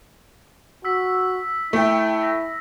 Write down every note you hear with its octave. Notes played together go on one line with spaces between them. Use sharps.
F#4 E6 B6
A3 E4 G5
A#6